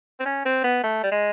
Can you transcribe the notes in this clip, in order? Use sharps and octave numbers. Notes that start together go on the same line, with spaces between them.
C4
C#4
C4
B3
A3
G3
G#3